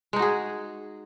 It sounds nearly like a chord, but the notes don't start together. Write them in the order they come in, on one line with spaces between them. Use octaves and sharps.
G#3 D#4 F#4 G#4